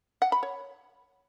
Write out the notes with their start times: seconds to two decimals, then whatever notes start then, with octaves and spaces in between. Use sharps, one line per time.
0.22 F#5
0.32 B5
0.43 C#5